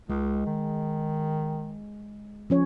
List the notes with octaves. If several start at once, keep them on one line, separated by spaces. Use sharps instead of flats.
C#2 G#3
D#3
F3 C#4 C#5